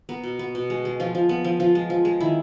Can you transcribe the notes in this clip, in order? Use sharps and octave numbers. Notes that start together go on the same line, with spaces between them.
B3 A#4
B2
B3
B2
G#3
G#3
F3 F4
F3
B3
F3
F3 F4
G#3
F3
G#3
D#3 E4